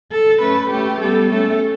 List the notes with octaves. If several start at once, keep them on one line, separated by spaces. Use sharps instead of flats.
A4
A3 C#4 B4
A3 C#4 G4
G3 B3 A4
A3 C#4 A4